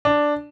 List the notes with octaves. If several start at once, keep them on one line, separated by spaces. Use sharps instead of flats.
D4